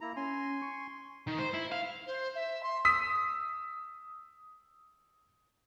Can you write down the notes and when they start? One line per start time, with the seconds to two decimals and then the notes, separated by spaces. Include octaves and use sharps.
0.01 A#3 E4 A#5
0.16 C#4 G#5 C6
0.62 C#6
1.28 D#3
1.39 C5
1.54 E4
1.72 F5
2.06 C5
2.35 E5
2.63 C6
2.85 D#6 E6 B6